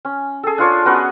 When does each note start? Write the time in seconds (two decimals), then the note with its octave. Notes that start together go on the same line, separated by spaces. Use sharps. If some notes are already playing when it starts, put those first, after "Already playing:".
0.05 C#4
0.43 G#4 A4
0.58 D4 F4 C#5 D5
0.85 B3 C#4 F#4 B4